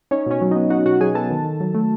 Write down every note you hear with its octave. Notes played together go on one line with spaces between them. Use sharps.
C#4 D#4 C#5
B2 C#4 C#5
F#3
B3 D#4 D#5
D#4 F#4 F#5
B2 F#4 F#5
F#3 G#4 G#5
B3 A4 A5
D#3
D#3
F#3
A3